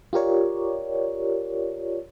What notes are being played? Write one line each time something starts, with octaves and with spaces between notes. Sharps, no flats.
F4 G4 A#4 C#5 D5